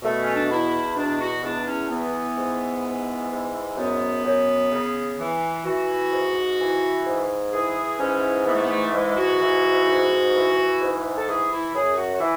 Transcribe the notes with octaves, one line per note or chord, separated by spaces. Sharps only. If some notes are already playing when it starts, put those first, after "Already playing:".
B2 A3
C#4
D4
E2 E4
B2 D4
F#4
E2 D4
C#4
E3 B3
G#2
E3
G#2
F#2 B3
F#2
C#3
E3
E3 F#4
G#2
E3
G#2
E3 G#4
G#2 C#4
E3 B3
A3
B3
A3
G#2 G#3
F#4
E3
G#2
E3
G#2
A4
E3 G#4
E4
F#2 G#4
F#4
F#4
E3